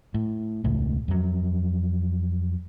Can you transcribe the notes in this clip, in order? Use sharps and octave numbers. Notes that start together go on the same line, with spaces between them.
A2
E1 C#2 A2
F2 F#3